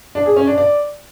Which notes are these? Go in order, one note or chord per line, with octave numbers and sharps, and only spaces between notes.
D4
G#4
C#4
D4
D5